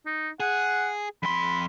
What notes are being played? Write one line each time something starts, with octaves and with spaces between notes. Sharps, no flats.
D#4
G#4 F#5
F2 B5 C6